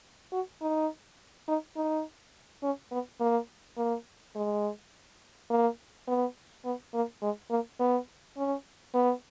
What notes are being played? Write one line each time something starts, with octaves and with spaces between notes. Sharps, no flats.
F#4
D#4
D#4
D#4
C#4
B3
A#3
A#3
G#3
A#3
B3
B3
A#3
G#3
A#3
B3
C#4
B3